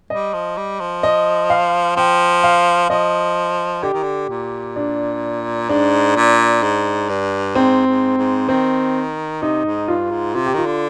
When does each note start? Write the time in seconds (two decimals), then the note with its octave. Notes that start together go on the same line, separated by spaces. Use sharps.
0.10 G3 D#5
0.33 F3
0.57 G3
0.80 F3
1.03 D#5
1.50 F5
1.96 F3 G5
2.43 F5
2.90 F3 D#5
3.83 D3 G4
3.93 D#3
4.03 D3
4.29 A#2
4.76 D4
5.69 G#2 D4
6.16 A#2
6.63 G#2
7.09 G2
7.55 G#2 C4
7.86 G#2
8.17 G#2
8.48 D#3 C4
9.42 C3 D#4
9.65 G#2
9.88 G2 F4
10.11 G#2
10.35 C3 F4
10.46 G4
10.54 D#3 F4
10.66 D3